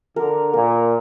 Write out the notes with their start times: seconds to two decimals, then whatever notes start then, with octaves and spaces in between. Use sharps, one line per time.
0.16 D3 A#4
0.54 A#2 A#4